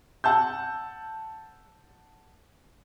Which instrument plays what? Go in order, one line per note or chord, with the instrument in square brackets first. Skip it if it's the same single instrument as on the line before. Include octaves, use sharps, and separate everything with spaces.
[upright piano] F#5 A5 E6 G6